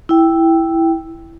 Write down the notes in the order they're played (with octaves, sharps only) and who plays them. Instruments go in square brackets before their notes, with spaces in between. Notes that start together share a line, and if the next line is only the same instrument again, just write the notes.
[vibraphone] E4 G5